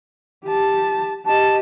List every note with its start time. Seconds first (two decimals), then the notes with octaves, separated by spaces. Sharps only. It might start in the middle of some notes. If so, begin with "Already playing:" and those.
0.45 G4 A5
1.26 G4 D#5 A5